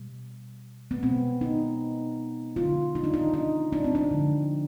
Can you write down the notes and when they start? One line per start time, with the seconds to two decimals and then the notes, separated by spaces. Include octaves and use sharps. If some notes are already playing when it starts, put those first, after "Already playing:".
Already playing: B2 G3
0.91 B3
1.03 B2 G#3 C4
1.41 D#4
2.56 D3 G#3 F4
2.95 D#4
3.04 D4
3.14 D#4
3.34 D#4
3.73 D4
3.84 C4
3.95 D4
4.11 D3 F3 G#3